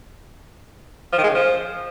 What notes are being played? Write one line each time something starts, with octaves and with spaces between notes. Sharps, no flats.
F3
D#3
G#3
C#3
F3